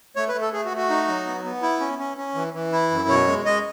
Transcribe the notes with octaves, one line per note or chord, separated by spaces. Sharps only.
A3 C#5
B4
A3
A4
A3 G#4
F#4
A3
F#4
D#4
F#3
B3
B3
E4
C#4
C#4
C#4
E3
E3
E4
F#2
B2 C#5
G#3
G#3 D#5